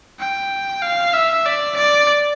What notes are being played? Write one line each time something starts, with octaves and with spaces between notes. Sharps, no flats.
G5
F5
E5
D5
D5